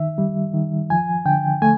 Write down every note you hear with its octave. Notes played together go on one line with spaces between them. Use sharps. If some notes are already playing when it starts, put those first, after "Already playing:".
Already playing: D#3 E5
G3
D#3
F3 G#5
D3 G5
A3 G#5